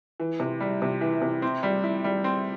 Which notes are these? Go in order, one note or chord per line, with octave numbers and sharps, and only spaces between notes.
E3
C3
G3
C3
E3
C3
C4
G3
E4
G3
C4